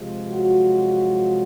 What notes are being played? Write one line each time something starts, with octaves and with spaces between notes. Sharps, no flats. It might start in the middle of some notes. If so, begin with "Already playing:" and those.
Already playing: C3 F3 G#3
F#3 F#4